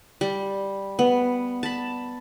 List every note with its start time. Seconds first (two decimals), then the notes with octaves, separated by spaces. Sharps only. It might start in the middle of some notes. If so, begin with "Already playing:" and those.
0.21 G3
0.99 B3
1.63 A5 B5